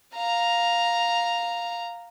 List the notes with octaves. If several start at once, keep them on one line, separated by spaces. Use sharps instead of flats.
F5 A#5